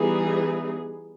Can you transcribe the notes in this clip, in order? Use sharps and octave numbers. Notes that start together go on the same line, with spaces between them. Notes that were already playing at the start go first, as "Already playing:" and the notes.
Already playing: E3 G3 B3 D#4 G#4